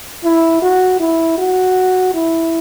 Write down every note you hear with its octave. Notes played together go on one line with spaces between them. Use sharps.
E4
F#4
E4
F#4
E4